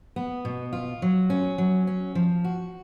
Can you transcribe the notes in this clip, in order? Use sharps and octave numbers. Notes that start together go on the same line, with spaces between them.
B3
B2
F4
F#3
C#4
F#3
C#4
F3
F#4